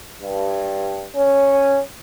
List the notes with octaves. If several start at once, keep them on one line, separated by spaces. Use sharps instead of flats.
G2
C#4